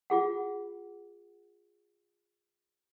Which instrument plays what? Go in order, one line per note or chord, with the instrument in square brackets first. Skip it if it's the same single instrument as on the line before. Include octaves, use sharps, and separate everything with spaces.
[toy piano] F4 G#4 F#5